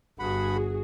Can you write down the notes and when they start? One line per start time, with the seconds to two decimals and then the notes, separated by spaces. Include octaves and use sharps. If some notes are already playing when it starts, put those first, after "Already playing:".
0.19 G1 G2 F#4 G#4 F#5 B5